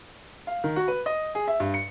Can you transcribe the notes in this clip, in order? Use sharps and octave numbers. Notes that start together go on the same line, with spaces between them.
F5
D#3
F#4
B4
D#5
G#4
E5
G2
C#7